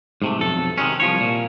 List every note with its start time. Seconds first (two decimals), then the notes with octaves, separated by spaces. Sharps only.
0.22 G#2 C3 A3
0.38 B1 F2 A4
0.78 C3 D#3 F#3 G#3 C#4
1.00 C2 F3 C#5
1.20 A#2